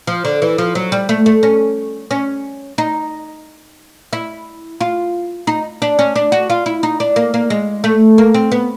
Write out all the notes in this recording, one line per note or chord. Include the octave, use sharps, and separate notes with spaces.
F3
D3
E3
F3
F#3
G3
A3
A3
C#4
C#4
D#4
E4
F4
D#4
D4
C#4
D4
F#4
F4
E4
D#4
D4
A#3
A#3
G#3
A3
A#3
C4
B3